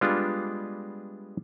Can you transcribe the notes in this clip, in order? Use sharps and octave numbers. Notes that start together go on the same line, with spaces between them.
G3 G#3 B3 D4 F4